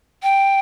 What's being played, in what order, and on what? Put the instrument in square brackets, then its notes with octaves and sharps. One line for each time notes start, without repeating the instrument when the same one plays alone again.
[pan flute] G5